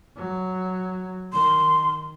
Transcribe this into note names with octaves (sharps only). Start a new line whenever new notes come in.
F#3
D#3 C6